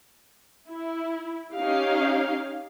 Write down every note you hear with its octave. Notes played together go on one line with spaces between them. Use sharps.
E4
C#4 D#4 G4 F5